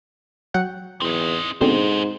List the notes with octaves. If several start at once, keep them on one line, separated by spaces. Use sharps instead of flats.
F#3 F#5 G5
E2 C4 D#4
G#2 B2 D3 C4 G#4 C5